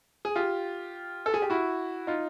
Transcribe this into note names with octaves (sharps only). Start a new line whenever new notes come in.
G#4
F4 G4
A4
G#4
G4
E4 F#4
D#4 F4